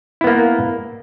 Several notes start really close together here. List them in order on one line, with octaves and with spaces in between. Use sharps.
E4 B3 A#3